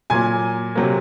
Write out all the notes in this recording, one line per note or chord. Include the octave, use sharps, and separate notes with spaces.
A#2 F#3 A#3 G#5 G#6
C3 F#3 A#3